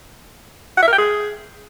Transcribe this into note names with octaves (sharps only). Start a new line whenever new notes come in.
F#5
E5
A#4
G5
G#4